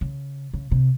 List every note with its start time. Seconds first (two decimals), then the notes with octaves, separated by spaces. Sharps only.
0.01 C#3
0.53 C#3
0.71 C3